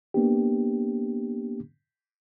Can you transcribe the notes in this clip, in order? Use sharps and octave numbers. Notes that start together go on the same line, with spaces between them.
A#3 B3 D4 G4